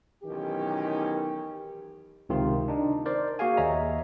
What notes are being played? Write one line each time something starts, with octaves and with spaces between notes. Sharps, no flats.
B1 D#3 E3 C#4 G4
C#2 C3 D#3 C4 F4
D4 D#4
A#4 C5 D5
A#3 F#4 G#4 F5 G#5
D#2 C#5 D#5 E5 A#5